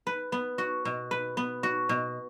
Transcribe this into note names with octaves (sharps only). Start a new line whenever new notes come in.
B4
B3
F#4
B2
B4
B3
F#4
B2